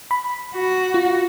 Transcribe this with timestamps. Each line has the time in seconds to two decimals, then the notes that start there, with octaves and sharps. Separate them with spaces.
0.11 B5
0.55 F#4
0.94 F4